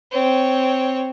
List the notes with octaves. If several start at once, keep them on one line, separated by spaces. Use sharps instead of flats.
C4 C#5